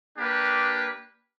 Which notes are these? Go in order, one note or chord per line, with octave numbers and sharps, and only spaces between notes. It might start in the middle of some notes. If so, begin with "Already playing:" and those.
A#3 D4 G4 B4